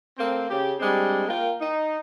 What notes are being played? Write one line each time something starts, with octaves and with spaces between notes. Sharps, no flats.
A3 A#3 C4
C#3 G4
G3 G#3 C4 D4
A#3 F4 A#4 G5
D#4